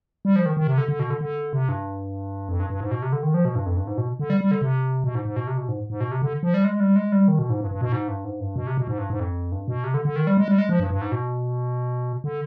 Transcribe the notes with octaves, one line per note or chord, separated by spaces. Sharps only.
G3
F3
D#3
D#3
C3
D3
D3
B2
D3
D3
C3
G2
F2
G2
G2
G#2
B2
C3
D3
D#3
F3
B2
G2
F2
G2
G#2
B2
D3
G3
G3
D3
C3
B2
G#2
G#2
B2
C3
B2
G#2
G#2
B2
C3
D3
F3
G3
G#3
G3
G#3
G3
D#3
B2
G#2
G2
G2
B2
G#2
G2
G#2
G2
B2
C3
B2
G#2
G2
G#2
F2
G2
B2
C3
D3
D3
D#3
G3
G#3
G3
G#3
F3
G2
G2
G#2
B2
D3